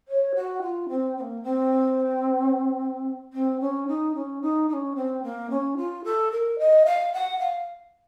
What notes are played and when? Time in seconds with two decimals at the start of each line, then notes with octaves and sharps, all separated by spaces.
0.08 C#5
0.35 F#4
0.61 F4
0.89 C4
1.17 C4
1.20 A#3
1.43 C4
3.33 C4
3.60 C#4
3.87 D#4
4.14 C#4
4.41 D#4
4.68 D#4
4.73 C#4
4.95 C4
5.23 A#3
5.50 C#4
5.76 F4
6.04 A4
6.31 A#4
6.58 D#5
6.85 F5
7.13 F#5
7.39 F5